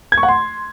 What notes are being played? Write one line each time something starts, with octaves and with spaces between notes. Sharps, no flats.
G#6
C#6
F#5
C6